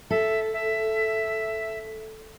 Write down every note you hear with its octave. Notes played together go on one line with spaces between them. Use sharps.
A4 E5
E5